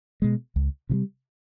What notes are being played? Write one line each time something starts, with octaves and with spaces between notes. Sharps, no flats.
B2 G#3
C#2
C3 E3 G3